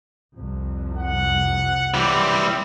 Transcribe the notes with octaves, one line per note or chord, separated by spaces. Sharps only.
C2 F2
F#5
E3 G3 C4